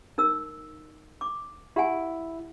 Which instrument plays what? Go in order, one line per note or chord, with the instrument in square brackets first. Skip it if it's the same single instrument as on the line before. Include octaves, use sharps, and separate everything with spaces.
[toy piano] D#4 A#4 E6
D6
[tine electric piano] E4 [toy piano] G4 F#5 G#5